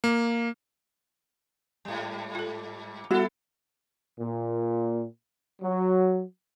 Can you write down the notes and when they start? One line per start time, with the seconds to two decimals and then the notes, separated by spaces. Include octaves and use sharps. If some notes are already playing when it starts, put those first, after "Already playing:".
0.04 A#3
1.85 G#2 G3
2.35 F4 A4
3.11 G3 B3 E4 F#4 A4
4.20 A#2
5.62 F#3